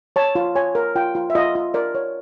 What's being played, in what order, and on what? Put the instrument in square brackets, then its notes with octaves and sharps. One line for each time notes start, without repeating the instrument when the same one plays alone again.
[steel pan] C#5 A5
F4
C#5 G#5
A#4
F4 G5
F4
E5
F4 D#5
F4
A#4 D5
C#5